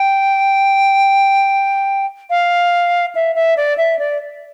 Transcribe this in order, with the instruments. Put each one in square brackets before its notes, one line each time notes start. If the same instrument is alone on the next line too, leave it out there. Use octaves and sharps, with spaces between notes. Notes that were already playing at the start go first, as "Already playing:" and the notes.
Already playing: [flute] G5
F5
E5
E5
D5
E5
D5